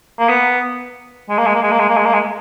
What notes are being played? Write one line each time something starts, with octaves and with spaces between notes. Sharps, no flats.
A#3
B3
G#3
A#3
G#3
A#3
G#3
A#3
G#3
A#3
G#3
A#3
G#3